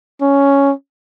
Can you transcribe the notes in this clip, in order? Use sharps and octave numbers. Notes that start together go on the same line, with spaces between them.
C#4